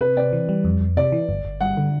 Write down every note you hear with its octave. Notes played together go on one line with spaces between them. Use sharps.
C3 B4
C4 D5
E3
G3
F2
F2
C3 D5
E3
G1
G1
G2 F#5
D3